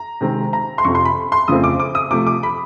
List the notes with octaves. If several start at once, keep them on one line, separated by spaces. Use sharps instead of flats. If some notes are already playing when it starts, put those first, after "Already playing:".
Already playing: A#5
C3 D#3 G#3 C4
A#5
C6
F2 C3 F3 C#6
C6
B5
C6
F2 C#3 F3 A3 C4 D#6
D6
D6
D#6
C3 F3 A3 D6
D6
B5